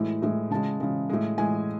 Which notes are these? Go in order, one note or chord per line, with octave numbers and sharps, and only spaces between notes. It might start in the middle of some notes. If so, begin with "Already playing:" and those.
Already playing: A2 E3 G#3
A2 E3 G#3
C#3 G#3 A5
C#3 G#3
A2 G#3
A2 G#3 G#5